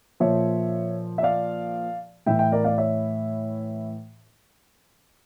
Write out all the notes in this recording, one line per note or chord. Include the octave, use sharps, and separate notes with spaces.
A#2 F3 C#5 E5
E5
D5 F5
A2 E3 E5 G5
E5 G5
A#4 D5
D5 F5
C#5 E5